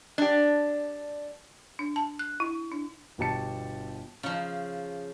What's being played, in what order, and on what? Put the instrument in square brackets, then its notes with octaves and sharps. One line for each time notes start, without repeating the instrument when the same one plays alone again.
[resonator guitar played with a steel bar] D4 G4
[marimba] D4
A5
F#6
E4
D4
[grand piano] G1 B2 G4 A5 C#7
[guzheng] C#3 F3